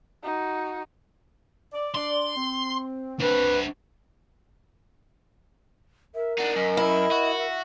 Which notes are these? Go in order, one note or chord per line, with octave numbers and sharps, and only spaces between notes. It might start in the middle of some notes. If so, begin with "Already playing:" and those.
D#4 F#4
D5
D4 D5 C6
C4
D4 B4 C5
A#4 E5
D4 D#4 F#5
F#2 D#5
E4
F#4
E5